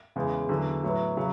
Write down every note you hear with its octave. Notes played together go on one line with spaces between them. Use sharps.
E2 C#3 G#3
E2 D3 F#3
A2 F#3 B3
C#3 F#3